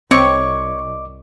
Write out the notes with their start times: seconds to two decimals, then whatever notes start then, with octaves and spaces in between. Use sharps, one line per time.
0.11 C2 C4 C#5 D#5 C#6 D6